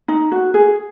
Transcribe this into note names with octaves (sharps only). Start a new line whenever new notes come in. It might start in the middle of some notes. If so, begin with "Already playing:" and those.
D#4
F#4
G#4